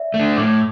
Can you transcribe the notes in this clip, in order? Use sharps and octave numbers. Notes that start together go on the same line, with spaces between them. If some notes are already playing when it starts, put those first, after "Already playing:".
Already playing: D5 E5
A3
D4
A2 D6